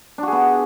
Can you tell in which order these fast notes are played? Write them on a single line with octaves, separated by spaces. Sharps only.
D4 F#4 G#4 B3